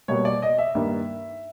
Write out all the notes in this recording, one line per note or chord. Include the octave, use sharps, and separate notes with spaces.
B2 G3 A#3 C#5
D5
D#5
E5
G2 D#3 G3 A#3